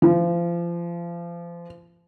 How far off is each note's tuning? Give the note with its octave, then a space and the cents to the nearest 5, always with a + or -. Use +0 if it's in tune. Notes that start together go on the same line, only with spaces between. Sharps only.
F3 -30